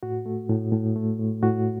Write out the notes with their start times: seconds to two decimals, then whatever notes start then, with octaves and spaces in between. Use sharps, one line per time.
0.03 A2 F#4
0.26 A3
0.50 A2
0.72 A2
0.95 A3
1.20 A2
1.43 A2 F#4